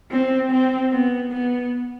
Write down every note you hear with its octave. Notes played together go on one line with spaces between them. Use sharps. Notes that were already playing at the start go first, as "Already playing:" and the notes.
C4
C4
B3
B3